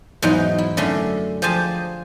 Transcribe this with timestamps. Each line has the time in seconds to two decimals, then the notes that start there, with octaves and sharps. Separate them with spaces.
0.22 E2 G#2 F#3 D#4 C5
0.58 E4
0.77 F#2 D3 A3 C#4 C6
1.42 F3 G4 G#4 C5 G#5 A5